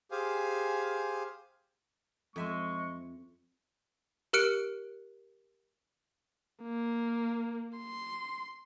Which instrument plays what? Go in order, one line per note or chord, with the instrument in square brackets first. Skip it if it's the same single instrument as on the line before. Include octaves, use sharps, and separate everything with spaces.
[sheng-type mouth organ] G4 G#4 C5 F5 G#5
[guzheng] F2 E5 G#5 [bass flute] F3 [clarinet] G#3 [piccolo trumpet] C#6
[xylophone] G4 A#4 F6 F#6 C#7 D7
[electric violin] A#3
C6